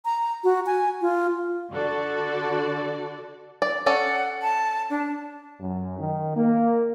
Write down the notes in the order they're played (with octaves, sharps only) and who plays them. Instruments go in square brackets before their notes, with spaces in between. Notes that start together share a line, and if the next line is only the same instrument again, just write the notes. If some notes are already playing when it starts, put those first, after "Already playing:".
[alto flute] A#5
F#4
G#5
F4
[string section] D3 F#4 A4 D5
[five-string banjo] D5
[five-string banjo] C#4 A4 D5 [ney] F#5
[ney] A5
D4
[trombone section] F#2
D#3
A#3